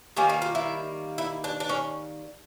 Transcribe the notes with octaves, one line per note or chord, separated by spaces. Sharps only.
D#3 G3 A#3 C#4
D#4
F4
E4
E4
D4
D4
C#4